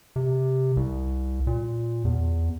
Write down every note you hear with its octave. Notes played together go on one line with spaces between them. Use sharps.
C3
C2
A#2
E2